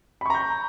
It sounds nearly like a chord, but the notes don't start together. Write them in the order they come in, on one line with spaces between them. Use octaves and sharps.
B5 C#6 A#5 G6